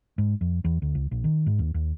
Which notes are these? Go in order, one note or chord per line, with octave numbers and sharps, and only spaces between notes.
G#2
F2
E2
D2
C#2
A#1
D#3
G#2
D#2
D#2